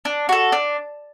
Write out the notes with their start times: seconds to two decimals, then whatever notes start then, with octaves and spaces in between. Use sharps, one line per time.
0.05 D4
0.29 F#4 A4
0.52 D4